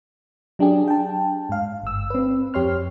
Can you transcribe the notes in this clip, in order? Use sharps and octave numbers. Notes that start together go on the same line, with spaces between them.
F#3 D4 G4 G#4
G5 A5
G#2 F5
G1 E6
C4 B4
F2 G4 C#5 C6 F6